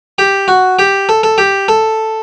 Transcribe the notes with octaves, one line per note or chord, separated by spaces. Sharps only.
G4
F#4
G4
A4
A4
G4
A4